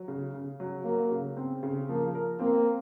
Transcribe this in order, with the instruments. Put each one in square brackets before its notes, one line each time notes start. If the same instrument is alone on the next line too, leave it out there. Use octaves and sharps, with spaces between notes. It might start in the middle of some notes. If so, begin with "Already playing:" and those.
Already playing: [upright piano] F#3
C#3
C#3
F#3
[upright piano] F#3 [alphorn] A#3
[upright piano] C#3
C4
C#3
[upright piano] F3 [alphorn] A#3
[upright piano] A#4
[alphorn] A#3 [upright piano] C4